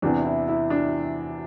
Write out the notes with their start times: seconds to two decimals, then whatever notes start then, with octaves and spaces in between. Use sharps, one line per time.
0.02 E2 C3 E3 D4
0.25 E4
0.48 E4
0.70 D4